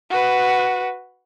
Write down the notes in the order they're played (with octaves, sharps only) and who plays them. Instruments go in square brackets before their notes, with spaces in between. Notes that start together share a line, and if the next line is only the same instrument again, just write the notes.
[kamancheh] F#4 B4